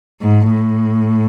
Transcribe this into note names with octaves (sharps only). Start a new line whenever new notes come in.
G#2
A2